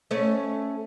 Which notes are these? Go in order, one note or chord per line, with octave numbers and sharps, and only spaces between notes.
A3 C#4 C#5